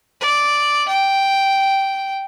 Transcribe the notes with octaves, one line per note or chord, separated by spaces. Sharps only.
D5
G5